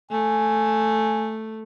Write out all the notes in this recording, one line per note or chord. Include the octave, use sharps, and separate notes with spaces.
A3 G#5